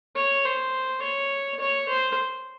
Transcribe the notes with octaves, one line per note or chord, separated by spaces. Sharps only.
C#5
C5
C#5
C#5
C5